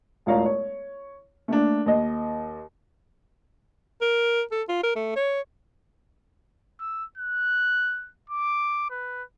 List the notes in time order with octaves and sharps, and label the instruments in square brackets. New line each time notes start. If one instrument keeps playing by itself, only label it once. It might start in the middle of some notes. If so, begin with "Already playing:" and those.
[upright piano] E1 A1 F4 C#5 F5 A#5
C#5
A3 A#3 D4
D#2 D#5
[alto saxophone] A#4
A4
F4
A#4
A3
C#5
[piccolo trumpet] E6
F#6
D6
B4